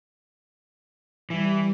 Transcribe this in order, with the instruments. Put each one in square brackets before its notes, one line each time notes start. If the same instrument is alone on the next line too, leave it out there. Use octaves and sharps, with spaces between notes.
[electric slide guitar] E3 [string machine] G3